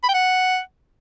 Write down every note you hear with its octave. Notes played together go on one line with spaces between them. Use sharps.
B5
G5
F#5